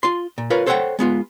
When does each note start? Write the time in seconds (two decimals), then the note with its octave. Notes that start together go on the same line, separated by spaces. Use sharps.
0.03 F4 C6
0.38 A#2
0.50 F4 A#4 B4 C#5
0.66 A4 C5 C#5 D#5 F#5 G5
0.99 G#3 B3 F4